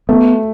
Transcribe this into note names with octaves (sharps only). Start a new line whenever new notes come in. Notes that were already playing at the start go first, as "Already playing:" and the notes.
A3 B3